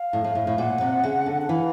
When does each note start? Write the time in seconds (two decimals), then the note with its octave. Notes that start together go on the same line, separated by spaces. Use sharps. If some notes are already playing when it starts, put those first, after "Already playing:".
Already playing: F5
0.13 A2
0.24 A2
0.35 A2
0.47 A2
0.58 A#2 F#5
0.81 C3
1.04 C#3
1.26 D3
1.42 F#5
1.49 E3 F5